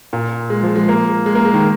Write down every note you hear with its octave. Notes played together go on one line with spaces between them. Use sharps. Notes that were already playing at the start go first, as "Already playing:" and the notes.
A#2
G#3
F3
G#3
A#3
G#3
A#3
G#3
D#3